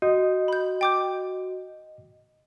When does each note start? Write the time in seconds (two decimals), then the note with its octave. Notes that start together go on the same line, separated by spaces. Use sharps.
0.02 F#4 D#5
0.48 B5 G6
0.81 G5 D6 G6